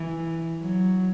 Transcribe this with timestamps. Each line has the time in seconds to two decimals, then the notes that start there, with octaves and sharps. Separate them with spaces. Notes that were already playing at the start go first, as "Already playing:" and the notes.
Already playing: E3
0.61 F#3